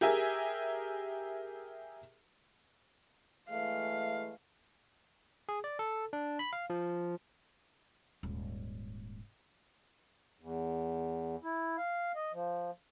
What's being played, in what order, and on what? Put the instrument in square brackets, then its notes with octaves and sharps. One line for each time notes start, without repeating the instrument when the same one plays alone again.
[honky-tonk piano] G4 G#4 A#4 E5 G#5
[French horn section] E3 G#3 A3 [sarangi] F5
[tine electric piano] G#4
D5
A4
D4
B5
F5
F3
[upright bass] D#1 G#2
[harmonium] E2
E4
F5
D#5
F3